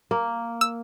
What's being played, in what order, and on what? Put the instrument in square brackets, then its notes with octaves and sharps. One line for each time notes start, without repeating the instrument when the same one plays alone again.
[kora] A#3
[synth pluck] E6